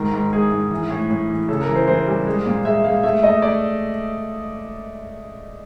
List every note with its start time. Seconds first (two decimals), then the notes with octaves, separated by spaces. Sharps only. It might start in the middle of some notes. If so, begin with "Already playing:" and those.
Already playing: G#2 D#3 A#4
0.13 G#2
0.32 G#2 G#4
0.52 G#2
0.71 E3
0.90 A2
1.10 A2
1.30 E3
1.48 C#3 A4
1.62 A#4
1.68 E3
1.75 C5
1.87 E3 C5
2.07 G3
2.27 G#3
2.46 A#2
2.65 G#3 E5
2.84 G#3 F5
3.03 A3 E5
3.23 A3 D#5
3.42 A3 D5